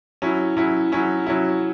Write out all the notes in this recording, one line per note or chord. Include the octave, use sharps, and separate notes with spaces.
F#3 C#4 E4
F#3 C#4 E4
F#3 C#4 E4
F#3 C#4 E4